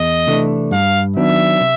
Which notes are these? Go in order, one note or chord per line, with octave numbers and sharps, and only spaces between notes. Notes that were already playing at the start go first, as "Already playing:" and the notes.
Already playing: E2 D#5
C3 E3 A3 D4
G2 F5
D#3 F#3 B3 D4 E5
C3